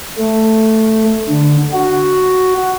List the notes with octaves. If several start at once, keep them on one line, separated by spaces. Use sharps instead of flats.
A3
D3
F#4